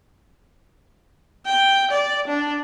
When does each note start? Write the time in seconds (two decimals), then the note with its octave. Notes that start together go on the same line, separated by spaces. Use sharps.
1.46 G5
1.91 D5
2.27 D4